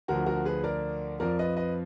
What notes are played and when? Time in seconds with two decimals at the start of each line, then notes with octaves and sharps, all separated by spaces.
0.08 D2 D3 F3 F#4 A#4
0.26 F#4 A#4
0.45 G#4 B4
0.64 A#4 D5
1.20 F2 F3 A#4 D5
1.39 B4 D#5
1.57 B4 D#5